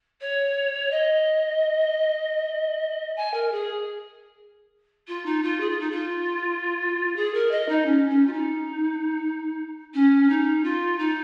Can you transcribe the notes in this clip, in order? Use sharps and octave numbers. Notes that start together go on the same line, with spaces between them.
C#5
D#5
G#5
A#4
G#4
F4
D#4
F4
G#4
F4
D#4
F4
G#4
A#4
D#5
D#4
C#4
C#4
F4
D#4
C#4
D#4
F4
D#4